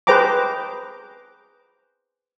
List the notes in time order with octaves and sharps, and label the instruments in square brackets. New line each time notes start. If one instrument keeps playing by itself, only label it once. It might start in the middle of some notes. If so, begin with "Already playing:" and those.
[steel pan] G#4 B4 C5 G5 A#5 D6